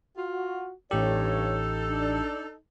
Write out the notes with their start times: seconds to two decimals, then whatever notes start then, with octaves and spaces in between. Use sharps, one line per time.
0.16 F4 F#4
0.91 A1 G2 D#4 G4 A4 C#5
1.89 D4